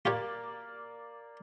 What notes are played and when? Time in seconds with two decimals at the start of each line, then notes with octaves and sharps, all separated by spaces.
0.05 A#3 F4 G4 C#5 D5